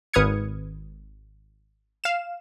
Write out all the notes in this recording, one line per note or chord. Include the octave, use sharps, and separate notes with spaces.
G#1 B4 D#6 F6 G#6 C#7
F5 E7